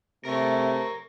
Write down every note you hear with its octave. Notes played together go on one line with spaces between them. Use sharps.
C3 A3 A#4 C#5